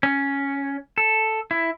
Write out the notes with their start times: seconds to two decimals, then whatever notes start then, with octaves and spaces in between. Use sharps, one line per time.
0.03 C#4
0.98 A4
1.51 E4